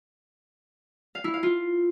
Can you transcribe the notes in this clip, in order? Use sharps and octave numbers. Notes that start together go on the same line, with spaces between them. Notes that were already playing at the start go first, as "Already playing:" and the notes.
F5
E4
F5
F4